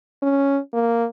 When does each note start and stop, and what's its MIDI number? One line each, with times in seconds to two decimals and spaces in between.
0.22 0.58 61
0.73 1.06 58